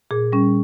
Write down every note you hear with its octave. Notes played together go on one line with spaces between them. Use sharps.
A#2 G#4
G3 C#4